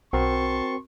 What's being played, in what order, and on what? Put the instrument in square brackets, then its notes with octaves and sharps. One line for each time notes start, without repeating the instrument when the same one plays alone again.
[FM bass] B1 [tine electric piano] C4 F#4 A#4 [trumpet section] A5 C6 C#6